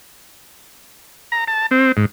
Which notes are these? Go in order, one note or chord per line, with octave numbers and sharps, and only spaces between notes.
A#5
A5
C4
G#2